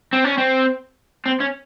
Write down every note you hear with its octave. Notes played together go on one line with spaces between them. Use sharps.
C4
C#4
C4
C4
C#4